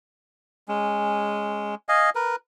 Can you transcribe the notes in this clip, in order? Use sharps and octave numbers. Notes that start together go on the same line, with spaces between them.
G#3 C#4
D#5 F5 G#5
A#4 B4